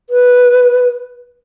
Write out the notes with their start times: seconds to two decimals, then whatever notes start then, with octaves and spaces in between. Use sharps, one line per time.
0.10 B4